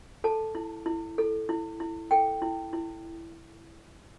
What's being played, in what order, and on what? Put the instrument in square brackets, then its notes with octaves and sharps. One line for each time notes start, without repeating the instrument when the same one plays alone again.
[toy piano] A4 A5
E4
E4
A4
E4
E4
A4 G5
E4
E4